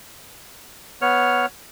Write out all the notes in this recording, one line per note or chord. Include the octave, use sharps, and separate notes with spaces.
B3 C#5 F6